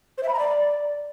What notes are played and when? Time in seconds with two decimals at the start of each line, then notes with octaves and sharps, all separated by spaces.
0.18 C5
0.23 E5
0.29 B5
0.34 A#5
0.39 D5